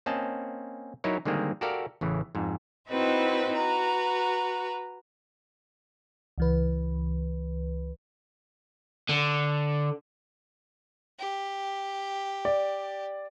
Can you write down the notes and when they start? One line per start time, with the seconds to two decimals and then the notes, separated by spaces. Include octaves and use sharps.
0.06 A#3 C4 C#4 D#5 A5
1.04 F#3 D#4 E4 A#4 C#5
1.25 D3 D#3 G3 G#3 A#3 C4
1.61 F#4 G4 A4 A#4 D5 F5
2.01 A1 C#3 E3
2.35 F2 G#2
2.89 C4 D#4 E4 F#4 B4 C5
3.55 F#4 B4 A#5
6.38 C#2 E3 B4
9.10 D3
11.20 G4
12.45 D5